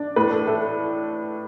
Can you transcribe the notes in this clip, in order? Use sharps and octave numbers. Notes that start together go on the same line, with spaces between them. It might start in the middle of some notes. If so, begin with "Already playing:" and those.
Already playing: D4
A2 B4
A4
E4 A4